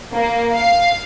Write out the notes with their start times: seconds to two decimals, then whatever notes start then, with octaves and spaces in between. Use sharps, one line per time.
0.14 A#3
0.54 F5